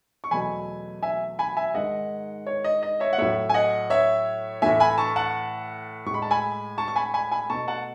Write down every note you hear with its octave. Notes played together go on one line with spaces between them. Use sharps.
C#6
E2 B2 F#3 A3 G#5 B5
E5 G#5
G#5 B5
E5 G#5
G#2 D#3 G#3 D#5 F#5
C#5
D#5
D#5
C#5 E5
F#5
A2 F#3 A3 C#5 E5
G#5
D#5 F#5
C#5 E5
A2 E3 A3 E5 G#5
G#5 B5
A5 C#6
F#5 A5
A2 G#3 B5 C#6
A5
G#5 B5
A5 C#6
C#6
G#5 B5
G#5 B5
G#5 B5
B2 A3 A5 C#6
F#5 A5